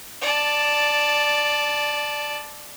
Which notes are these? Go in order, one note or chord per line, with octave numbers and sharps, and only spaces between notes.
D5 A5